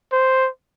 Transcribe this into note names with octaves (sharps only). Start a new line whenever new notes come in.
C5